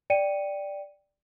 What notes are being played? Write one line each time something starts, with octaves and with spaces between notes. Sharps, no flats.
D5 G5 C#7 D#7